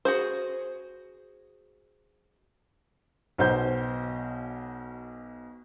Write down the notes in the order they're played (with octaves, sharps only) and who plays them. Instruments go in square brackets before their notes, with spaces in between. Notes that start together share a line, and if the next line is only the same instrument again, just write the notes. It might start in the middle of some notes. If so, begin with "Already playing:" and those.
[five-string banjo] F#4 G#4 C5
[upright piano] B1 B2 C5 G6